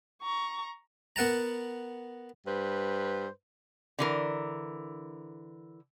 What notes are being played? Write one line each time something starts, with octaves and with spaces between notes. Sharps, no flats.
A#5 C#6
B3 A#4 F#5 A5 A#5
G2 B4 C5
D3 E3 A#4